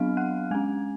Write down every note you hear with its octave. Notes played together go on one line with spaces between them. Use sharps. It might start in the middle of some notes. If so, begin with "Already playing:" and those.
Already playing: F#3 B3 D4 F5 F6
F#5 F#6
G#3 C#4 G#5 G#6